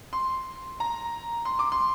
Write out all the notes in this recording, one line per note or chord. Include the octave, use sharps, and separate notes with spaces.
C6
A#5
C6
D6
C6